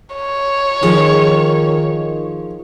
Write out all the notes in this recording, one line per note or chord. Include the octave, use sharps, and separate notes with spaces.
C#5
D#3 F3 G#4